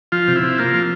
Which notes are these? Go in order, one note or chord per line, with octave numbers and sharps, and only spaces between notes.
F3 F4
C3
E4
C3
A#3 F4
F3